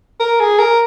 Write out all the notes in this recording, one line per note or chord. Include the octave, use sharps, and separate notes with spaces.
A#4
G#4
A#4